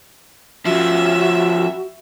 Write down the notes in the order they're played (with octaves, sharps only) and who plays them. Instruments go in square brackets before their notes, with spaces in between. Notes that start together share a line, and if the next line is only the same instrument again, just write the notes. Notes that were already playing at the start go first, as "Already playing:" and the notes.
[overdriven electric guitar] F3 C#4 [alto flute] F#4 [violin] E5